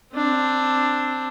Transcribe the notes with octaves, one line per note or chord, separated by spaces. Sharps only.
C4 D4